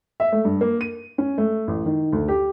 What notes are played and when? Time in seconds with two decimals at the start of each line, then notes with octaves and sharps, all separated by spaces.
0.20 E5
0.32 A3
0.45 G2
0.61 A#3
0.81 D#7
1.18 C#4
1.38 A3
1.68 A1
1.86 D#3
2.13 D2
2.28 G4